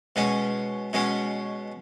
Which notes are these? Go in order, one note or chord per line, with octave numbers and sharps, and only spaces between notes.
B2 G#3 C#4
B2 G#3 C#4